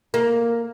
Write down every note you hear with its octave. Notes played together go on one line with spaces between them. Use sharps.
A#3